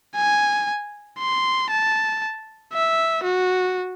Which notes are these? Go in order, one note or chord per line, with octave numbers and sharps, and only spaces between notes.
G#5
C6
A5
E5
F#4